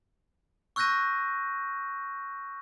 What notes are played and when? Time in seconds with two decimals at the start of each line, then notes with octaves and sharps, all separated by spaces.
0.76 C#6 E6 F#6 G6 A#6 D#7